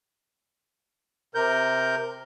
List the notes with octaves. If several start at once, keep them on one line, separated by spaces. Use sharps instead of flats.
C3 A#4 G6